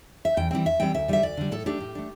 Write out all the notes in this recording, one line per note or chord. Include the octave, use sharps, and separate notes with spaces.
E5
E2 G5
E3 G3 C4 G5
E2 E5
E3 G3 C4 G5
D2 E5
D3 G3 E5
D2 D5
D3 G3
A2 A4
A3 D4 G4
A2
A3 D4